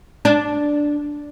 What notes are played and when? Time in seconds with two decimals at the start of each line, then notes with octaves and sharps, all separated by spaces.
0.25 D4